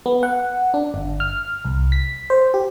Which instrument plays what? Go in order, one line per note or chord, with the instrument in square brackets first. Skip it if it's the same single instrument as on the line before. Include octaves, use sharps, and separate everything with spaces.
[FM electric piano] B3
F#5
D4
G1
F6
C2
B6
C5
G4